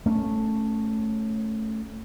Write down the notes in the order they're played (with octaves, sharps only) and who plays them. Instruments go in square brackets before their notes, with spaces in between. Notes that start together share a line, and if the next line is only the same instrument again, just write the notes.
[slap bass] A3 C#4